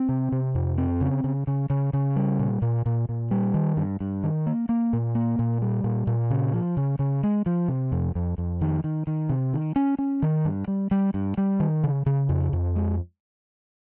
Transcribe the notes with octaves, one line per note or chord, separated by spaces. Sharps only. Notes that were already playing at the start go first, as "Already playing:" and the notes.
Already playing: C4
C3
C3
F2
C4
C#3
C#3
C#3
C#3
C#3
G3
A#2
A#2
A#2
A#2
G3
D#3
G2
G2
D#3
A#3
A#3
A#2
A#3
A#2
G3
A#2
A#2
C#3
F3
C#3
C#3
G#3
F3
C3
F2
F2
F2
D#3
D#3
D#3
C3
D#3
C#4
C#4
D#3
G2
G3
G3
G2
G3
D#3
C#3
C#3
F2
F2
G#3